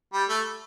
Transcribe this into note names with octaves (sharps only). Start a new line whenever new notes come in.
G3
A3